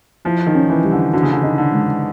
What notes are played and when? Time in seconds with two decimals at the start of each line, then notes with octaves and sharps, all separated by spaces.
0.25 F3 E4
0.46 D#3
0.55 C#4
0.70 E3
0.84 G3
0.92 D3
1.13 D3 F#4
1.23 C#3
1.32 D3
1.43 D#4
1.58 D3
1.72 G#3